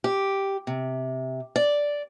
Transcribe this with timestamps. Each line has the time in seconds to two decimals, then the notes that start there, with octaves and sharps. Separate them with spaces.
0.04 G4
0.67 C3
1.56 D5